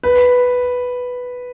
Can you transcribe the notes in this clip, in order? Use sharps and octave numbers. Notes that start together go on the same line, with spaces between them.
B4